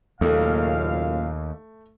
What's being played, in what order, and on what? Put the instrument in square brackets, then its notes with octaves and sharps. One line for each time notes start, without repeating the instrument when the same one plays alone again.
[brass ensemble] F#1 A#2 F5 [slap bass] D#2 [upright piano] A3